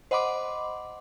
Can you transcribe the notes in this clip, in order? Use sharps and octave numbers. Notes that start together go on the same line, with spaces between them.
C5 D#5 F#5 B5 C6 D6